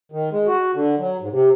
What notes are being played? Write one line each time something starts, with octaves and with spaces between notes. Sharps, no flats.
D#3
G#3
F#4
D3
F#3
G#2
C3